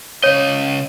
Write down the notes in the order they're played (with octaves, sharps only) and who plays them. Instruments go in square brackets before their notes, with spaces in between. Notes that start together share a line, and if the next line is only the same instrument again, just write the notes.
[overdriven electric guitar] C#3 D#5 [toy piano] C#5